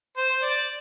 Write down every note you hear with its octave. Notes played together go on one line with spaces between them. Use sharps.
C5
D5